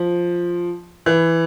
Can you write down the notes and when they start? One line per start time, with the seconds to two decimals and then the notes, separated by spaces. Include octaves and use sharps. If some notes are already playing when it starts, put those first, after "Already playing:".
Already playing: F3
1.06 E3